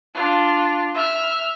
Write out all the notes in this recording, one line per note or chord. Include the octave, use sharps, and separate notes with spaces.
D4 F4
E5 F6